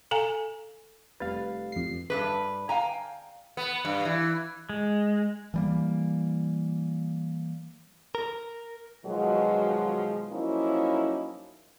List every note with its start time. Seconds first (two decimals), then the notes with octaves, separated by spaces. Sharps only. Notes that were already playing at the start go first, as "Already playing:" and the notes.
0.11 A4 F5 G#5 A#5
1.20 F1 G3 B4 F5 A6
1.72 F2 C7
2.10 G2 B2 B4
2.69 F5 G5 G#5 A#5
3.57 B3
3.85 G2
4.05 E3
4.69 G#3
5.54 E3 G3 A#3
8.15 A#4
9.06 B2 D#3 F3 F#3 G#3
10.31 F3 F#3 A#3 C#4 D#4 E4